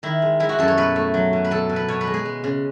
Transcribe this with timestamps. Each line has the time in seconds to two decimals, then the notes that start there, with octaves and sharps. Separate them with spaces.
0.03 D#3 E4
0.22 G#3
0.40 G#3 E4
0.49 F#4
0.59 F#2 A4
0.68 C#5
0.77 B2 B4
0.96 A3
1.14 F#3
1.33 B2
1.44 B4
1.51 B2 A4
1.69 B2
1.76 B4
1.88 B2 C#5
2.01 B4
2.07 G#3
2.14 G#4
2.25 G#3
2.44 C#3